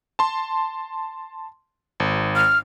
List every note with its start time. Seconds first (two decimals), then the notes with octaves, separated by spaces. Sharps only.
0.19 A5 C6
2.00 G#1
2.36 F6